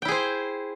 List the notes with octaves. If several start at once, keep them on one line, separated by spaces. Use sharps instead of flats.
E4 G#4 C5 G5